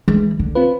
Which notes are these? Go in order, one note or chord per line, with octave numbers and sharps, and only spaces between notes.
E3 G#3
D3
C4 F4 B4